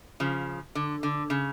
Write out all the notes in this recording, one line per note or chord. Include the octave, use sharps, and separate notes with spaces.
C#3 F3
D3
D3
C#3